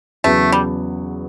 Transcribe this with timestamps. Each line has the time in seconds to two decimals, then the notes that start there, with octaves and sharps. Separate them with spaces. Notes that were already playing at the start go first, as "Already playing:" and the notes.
0.24 E2 C#3 F#3 A3 B3
0.52 G3